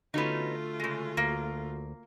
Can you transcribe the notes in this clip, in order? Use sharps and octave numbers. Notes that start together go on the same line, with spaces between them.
D3 A3 B3 C#4 D#4 F4 F#4
C#3 G#3
D2 A#3